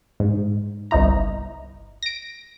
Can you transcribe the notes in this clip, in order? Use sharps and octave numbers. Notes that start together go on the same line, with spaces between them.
G#2
G1 C2 D#4 E4 A#5
A#6 D7